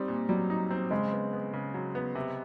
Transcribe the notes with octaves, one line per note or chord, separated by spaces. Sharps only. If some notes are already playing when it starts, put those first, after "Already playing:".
Already playing: G3 C4 D#4
A#2
F#3 G3
D#4
C4
C#3 G#3
B3
B3
C#3
F#3
B3
C3